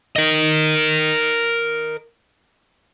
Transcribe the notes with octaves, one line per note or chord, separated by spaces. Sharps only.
A#4 D#5